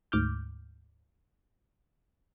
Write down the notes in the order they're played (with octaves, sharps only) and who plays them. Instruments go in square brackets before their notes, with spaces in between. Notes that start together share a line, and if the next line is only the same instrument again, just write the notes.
[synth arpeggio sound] D2 G#2 D6 F6 G6